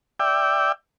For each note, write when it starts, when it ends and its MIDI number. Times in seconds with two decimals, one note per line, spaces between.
0.20 0.72 74
0.20 0.72 76
0.20 0.72 79